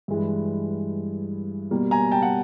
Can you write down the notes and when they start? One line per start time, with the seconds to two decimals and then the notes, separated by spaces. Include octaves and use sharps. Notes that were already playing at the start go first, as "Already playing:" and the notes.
0.08 G2 E3 G#3
1.71 B2 G3 A#3
1.91 G#5 A#5
2.11 G5 A5
2.22 F#5